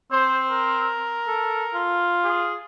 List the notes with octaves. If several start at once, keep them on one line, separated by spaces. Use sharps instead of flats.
C4 C5
A#4
A4
F4
G#4